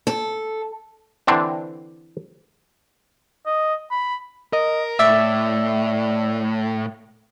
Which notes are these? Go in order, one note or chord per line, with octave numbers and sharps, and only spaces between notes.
A4
D3 E3 C4 D4
D#5
B5
A#4 D#5
A2 D5 E5 E6